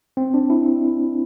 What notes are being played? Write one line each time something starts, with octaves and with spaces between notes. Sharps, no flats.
C4
D4
E4